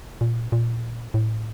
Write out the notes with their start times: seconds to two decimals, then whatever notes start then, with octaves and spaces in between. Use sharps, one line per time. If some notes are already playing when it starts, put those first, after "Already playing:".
0.21 A#2
0.52 A#2
1.14 A2